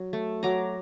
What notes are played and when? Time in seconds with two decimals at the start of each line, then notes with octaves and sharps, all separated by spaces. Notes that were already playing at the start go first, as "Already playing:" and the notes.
Already playing: F#3
0.13 A3
0.43 F#3 A#5 D6